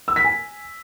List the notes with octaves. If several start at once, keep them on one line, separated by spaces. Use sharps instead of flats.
E6
B6
G#5